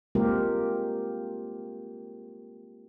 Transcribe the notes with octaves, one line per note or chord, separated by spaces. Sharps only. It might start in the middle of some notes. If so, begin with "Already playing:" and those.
G#3 A#3 C4 F4 G4 A#4